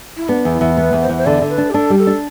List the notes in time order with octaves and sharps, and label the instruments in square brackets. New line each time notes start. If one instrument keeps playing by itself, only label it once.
[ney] E4
[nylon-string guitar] B3 [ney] D4
[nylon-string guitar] E2
[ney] E4
[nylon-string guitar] E2
[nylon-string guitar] B3 [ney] B4
[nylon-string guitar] E2
[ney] C5
[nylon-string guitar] E2
[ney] C5
[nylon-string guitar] D3 [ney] D5
[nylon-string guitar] D3
[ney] B4
[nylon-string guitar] D4
[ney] G4
[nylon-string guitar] D4 [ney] A4
[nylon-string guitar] G3
[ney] A4
[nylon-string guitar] D4